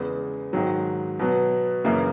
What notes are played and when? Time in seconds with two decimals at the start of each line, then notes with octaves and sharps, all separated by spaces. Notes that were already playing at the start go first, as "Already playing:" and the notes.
Already playing: E2 C#3 G#3 B3
0.53 G#2 D#3 F#3
1.19 B2 F#3 B3
1.85 F#2 C#3 E3 A#3